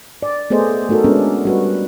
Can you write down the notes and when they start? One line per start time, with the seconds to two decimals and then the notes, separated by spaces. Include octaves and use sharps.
0.23 D5
0.50 A3 B3 G#4 A4 C5 D#5
0.89 A3 D#4 F#4 A4 A#4
1.04 G#3 B3 C#4 D4
1.45 G3 F#4 B4